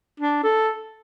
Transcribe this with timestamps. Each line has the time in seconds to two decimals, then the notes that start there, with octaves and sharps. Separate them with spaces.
0.20 D4
0.44 A4